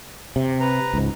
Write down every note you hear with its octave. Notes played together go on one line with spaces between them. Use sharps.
C3
B4 A#5
C#2 G#2